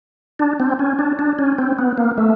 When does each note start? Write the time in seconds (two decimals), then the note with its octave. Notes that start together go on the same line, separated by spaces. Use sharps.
0.39 D4
0.60 C4
0.79 C#4
0.99 D4
1.19 D4
1.39 C#4
1.58 C4
1.79 B3
1.98 A#3
2.18 A3